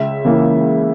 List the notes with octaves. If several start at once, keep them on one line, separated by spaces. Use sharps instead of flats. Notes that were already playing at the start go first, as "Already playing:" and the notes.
Already playing: C#2 E5
C#3 E3 A#3